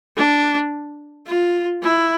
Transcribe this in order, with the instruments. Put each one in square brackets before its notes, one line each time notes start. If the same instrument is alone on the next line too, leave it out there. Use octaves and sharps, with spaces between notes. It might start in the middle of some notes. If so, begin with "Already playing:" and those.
[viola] D4
F4
E4